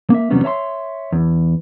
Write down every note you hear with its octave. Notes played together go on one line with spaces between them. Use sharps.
A#3 E5
E2 C3 F#3 G3 B3 C#4
C#5 E5 A5 C6
E2